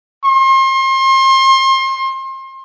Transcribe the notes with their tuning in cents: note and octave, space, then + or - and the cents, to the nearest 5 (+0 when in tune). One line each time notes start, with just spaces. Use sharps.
C6 +35